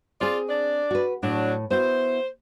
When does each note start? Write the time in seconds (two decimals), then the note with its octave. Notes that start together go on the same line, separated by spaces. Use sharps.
0.21 C4 F4 G#4 D5
0.49 D4 D5
0.91 F#4 B4
1.23 A2 F#3 D4
1.70 B3 E4 F#4 C5